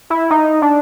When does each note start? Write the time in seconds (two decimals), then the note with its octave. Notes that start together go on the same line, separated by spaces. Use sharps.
0.10 E4
0.31 D#4
0.62 D4